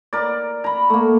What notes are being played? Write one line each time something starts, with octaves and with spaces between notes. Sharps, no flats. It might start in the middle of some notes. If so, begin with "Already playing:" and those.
A#4 D5
A#5 B5
A3 A#3